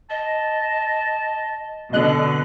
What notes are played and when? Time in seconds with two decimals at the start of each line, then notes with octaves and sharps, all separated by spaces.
0.10 D#5 A5
1.93 B2 D3 D#5 F#6 F#7